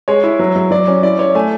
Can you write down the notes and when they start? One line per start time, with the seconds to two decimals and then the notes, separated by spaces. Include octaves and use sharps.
0.08 G#3 C#5
0.24 E4
0.39 F#3
0.56 F#3
0.71 F#3 D5
0.87 C#4
1.03 E4 D5
1.19 E4 C#5
1.35 A3 G#5